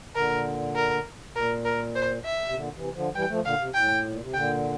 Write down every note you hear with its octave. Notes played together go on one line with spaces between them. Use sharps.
A#2 D3 A#4
A#4
A#2 A#4
A#4
C5
E5
C3
A#2 D3
C3 E3
D3 F3
E3 G3 G5
F3 A3
A#2 D3 F5
C3
A2 G5
A#2
C3
A#2 D3 G5